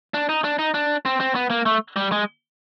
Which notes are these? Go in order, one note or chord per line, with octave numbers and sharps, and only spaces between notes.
D4
D#4
D4
D#4
D4
C4
C4
B3
A#3
A3
G3
G#3